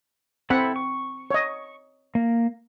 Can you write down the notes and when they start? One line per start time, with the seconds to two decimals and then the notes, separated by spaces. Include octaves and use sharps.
0.50 C4 E4 A4 F#5 B5
0.76 C#6
1.31 C#5 D#5
2.15 A#3